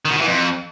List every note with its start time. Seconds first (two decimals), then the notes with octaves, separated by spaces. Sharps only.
0.05 D#3
0.10 B2
0.16 D#3
0.21 E3
0.26 F2